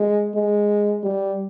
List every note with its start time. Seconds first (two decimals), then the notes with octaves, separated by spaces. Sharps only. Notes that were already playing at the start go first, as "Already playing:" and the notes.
Already playing: G#3
0.35 G#3
1.03 G3